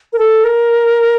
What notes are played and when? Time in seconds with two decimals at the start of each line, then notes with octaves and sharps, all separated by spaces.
0.13 A#4
0.18 A4
0.44 A#4